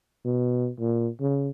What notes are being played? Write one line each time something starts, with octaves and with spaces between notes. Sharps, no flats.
B2
A#2
C#3